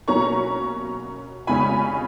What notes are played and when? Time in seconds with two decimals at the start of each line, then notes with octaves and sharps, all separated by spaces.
0.08 B2 F#3 A#3 C#4 A#5 C#6
1.47 F2 C#3 G#3 C#4 G#5 B5